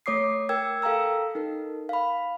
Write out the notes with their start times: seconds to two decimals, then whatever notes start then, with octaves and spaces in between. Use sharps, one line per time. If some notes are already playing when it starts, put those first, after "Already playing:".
0.06 A3 C#5 D6 D#6 C7
0.49 A#4 G5 E6 G#6
0.82 A4 F5 G5 A#5 E6
1.35 D#4 A4 A#4
1.89 F5 B5